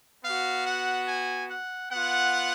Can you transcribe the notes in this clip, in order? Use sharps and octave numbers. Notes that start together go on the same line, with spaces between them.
B3 F#4 F5
F#5
G#5
F#5
B3 F4 F#5